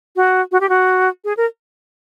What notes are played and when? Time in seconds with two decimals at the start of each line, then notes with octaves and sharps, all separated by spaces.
0.16 F#4
0.52 F#4
0.61 G4
0.69 F#4
1.25 G#4
1.37 A#4